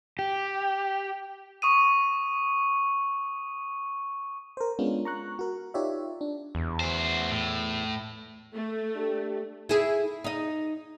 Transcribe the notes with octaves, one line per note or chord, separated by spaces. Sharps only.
G4
C#6 D#6 D#7
A#4 C5
G#3 B3 C#4 D4 F4
A#5 C#6 F#6
F#4 A#4
D#4 F4 G4 C#5 D5 E5
D4
E2
F#4 C5
A2
A3
D4 G4
E4 G#4
D#4 D#5